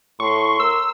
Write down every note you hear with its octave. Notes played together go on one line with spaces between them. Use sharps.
A2 C6 C#6
A#4 E6